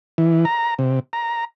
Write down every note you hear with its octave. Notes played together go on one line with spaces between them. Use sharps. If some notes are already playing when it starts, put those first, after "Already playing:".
E3
A#5
C3
A#5